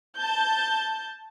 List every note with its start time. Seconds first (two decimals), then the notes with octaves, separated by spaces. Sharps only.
0.17 A5 G6